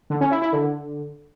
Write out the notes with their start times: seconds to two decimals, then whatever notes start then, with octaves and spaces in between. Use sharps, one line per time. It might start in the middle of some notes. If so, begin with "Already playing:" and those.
0.10 D3
0.21 C#4
0.31 E4
0.42 E4
0.53 D3